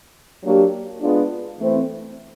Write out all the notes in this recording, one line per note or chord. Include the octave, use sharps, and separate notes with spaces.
F#3 A#3 D4 G4
G#3 B3 D4 F4
E3 A3 C4